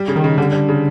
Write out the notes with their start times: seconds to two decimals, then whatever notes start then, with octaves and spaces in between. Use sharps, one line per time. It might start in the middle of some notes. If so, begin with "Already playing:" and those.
Already playing: G3
0.08 C#3
0.16 D#3
0.24 C#3
0.38 D3 G3
0.53 G3
0.69 C#3